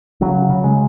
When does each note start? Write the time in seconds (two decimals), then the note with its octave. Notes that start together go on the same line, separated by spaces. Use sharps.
0.21 C#3 F#3
0.49 C#3
0.64 G#3